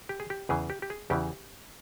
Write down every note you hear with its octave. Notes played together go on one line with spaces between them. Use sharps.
G4
G#4
G4
E2 C#3 E3 G#4
G4
G4
G#4
E2 C#3 E3 G4